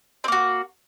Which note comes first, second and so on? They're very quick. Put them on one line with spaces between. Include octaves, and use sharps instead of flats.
C4 A#3 F#4